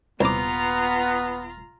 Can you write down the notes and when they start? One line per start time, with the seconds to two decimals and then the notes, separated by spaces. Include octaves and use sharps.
0.21 D#1 C2 B3 F4 A#5 D6